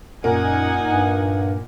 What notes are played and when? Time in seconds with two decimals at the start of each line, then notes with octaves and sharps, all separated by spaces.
0.24 F#2 A#2 D#4 A#4 F#5 G#5
0.87 G2